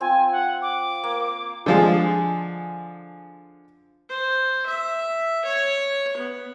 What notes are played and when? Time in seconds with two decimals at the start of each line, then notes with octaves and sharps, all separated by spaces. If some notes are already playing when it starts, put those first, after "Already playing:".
0.01 C4 F4 G#5
0.31 F#5
0.62 D6
1.04 A#3
1.66 D3 F3 G#3
4.09 C5
4.66 E5
5.45 C#5
6.17 B3